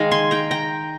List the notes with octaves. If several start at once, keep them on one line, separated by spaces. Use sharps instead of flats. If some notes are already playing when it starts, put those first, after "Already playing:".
Already playing: D#3 G#3 F5
G#5 C6
G5 A#5
G5 A#5